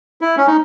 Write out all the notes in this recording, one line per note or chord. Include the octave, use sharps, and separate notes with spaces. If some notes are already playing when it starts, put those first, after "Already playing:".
E4
C#4
D#4